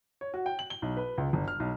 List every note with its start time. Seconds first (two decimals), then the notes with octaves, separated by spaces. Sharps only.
0.21 C#5
0.34 F#4
0.46 G5
0.59 F#7
0.70 G7
0.82 B1
0.97 B4
1.18 C#2
1.33 G1
1.48 F6
1.60 B1